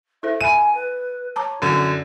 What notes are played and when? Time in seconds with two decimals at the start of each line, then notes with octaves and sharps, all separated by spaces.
0.23 E4 A4 C5 E5
0.41 E5 G#5 B5 D#7
0.74 B4
1.36 C#5 A5 A#5 D6
1.62 F#2 D3 E4